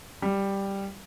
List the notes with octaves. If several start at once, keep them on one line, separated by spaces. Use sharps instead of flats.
G3